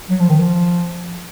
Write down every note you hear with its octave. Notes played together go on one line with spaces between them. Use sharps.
F#3
F3
D#3
F3